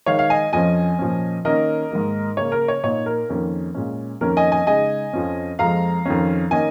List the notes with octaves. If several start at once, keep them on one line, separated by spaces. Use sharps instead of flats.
D#3 G#3 D#4 C#5 F5
F5
D#5 G#5
F2 F3 C#4 D#5 G#5
A#2 F3 C#4
D#3 A#3 C#4 A#4 D#5
G#2 D#3 A#3
C#3 A#3 C#4 C#5
A#4
C#5
A#2 A#3 D#4 C#5
A#4
F2 D#3 A#3 C#4
A#2 G#3 C#4
F2 D#3 A#3 C#4 A#4
D#5 G#5
D#5 G#5
C#3 G#3 D#4 D#5 G#5
F2 F3 C#4
F2 F3 G#3 F5 A#5
F2 D#3 C#4
D#3 A#3 C#4 D#5 G#5